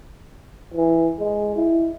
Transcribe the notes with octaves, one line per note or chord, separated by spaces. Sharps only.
E3
G#3
E4